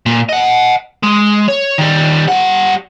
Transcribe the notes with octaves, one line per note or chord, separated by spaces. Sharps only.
A#2
D#5 F#5
G#3
C#5
D#3 G3
G3 F#5